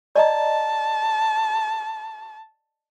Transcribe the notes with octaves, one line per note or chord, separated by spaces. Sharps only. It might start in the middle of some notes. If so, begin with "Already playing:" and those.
D5 D#5 A5 A#5